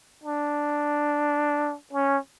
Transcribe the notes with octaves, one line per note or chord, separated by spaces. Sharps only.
D4
C#4